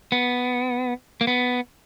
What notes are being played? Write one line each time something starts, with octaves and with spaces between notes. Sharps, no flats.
B3
A#3
B3